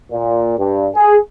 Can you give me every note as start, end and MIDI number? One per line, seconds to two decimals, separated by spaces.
0.12 0.57 46
0.58 0.89 43
0.95 1.17 68